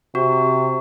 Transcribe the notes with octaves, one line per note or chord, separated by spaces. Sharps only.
C3 F#4